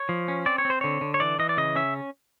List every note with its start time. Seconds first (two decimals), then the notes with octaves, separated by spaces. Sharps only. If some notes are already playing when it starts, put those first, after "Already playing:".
Already playing: C#5
0.09 F3
0.28 C#4
0.46 C4 D5
0.58 C#5
0.65 C4
0.70 C5
0.81 D3 C#5
1.01 D3
1.14 C#5
1.20 E3 D5
1.39 E3 D#5
1.49 D5
1.57 C#3 D#5
1.76 C#4 E5